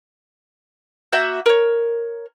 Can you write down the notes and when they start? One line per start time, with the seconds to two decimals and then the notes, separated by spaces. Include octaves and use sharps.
1.12 A#3 F#4 E5 G6
1.46 A#4 C#5